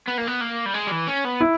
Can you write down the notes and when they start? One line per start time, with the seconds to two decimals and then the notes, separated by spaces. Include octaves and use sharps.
0.07 B3
0.17 A#3
0.27 B3
0.41 A#3
0.65 G3
0.74 G#3
0.87 G3
0.92 E3
1.07 C#4
1.25 B3
1.41 E4